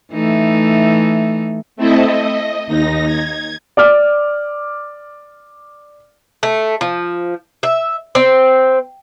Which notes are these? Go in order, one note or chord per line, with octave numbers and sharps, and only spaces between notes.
E3 A3 D#4
A3 C4 E4 A4 D#5 E5
D#5
D#2 D#4 A#6
G#6
D5 D6 F6
A3
F3
E5
C4